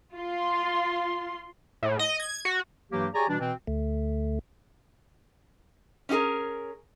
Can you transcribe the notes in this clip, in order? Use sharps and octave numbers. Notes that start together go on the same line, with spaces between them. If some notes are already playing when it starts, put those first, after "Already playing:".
F4 C6
A2
D#5
G#6
F#4
G2 E3 F#3 A#3 G4
G4 G#4 C#5 D5 G#5 A#5
B2 E3 G3 D4
B2 E3 C4
D2 A3
C#4 D#4 F#4 G#4 A#4